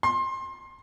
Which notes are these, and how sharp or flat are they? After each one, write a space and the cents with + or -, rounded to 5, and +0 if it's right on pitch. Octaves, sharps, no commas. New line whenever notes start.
C6 +25